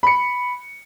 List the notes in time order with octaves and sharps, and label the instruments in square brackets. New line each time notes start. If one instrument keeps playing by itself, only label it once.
[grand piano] B5 C#7